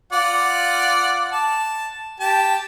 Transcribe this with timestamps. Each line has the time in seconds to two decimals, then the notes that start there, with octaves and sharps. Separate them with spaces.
0.13 F4 D5 F#5
1.32 A5
2.20 G4 A5